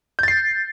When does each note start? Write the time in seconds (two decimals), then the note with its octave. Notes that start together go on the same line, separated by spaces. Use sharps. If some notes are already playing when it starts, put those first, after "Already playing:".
0.19 G6
0.23 A6
0.28 C7